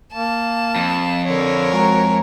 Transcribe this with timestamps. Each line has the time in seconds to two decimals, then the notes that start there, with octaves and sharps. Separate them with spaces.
0.13 A#3 A5
0.76 F2
1.25 D3 A#4 C#5
1.73 G#3 F#4 A#5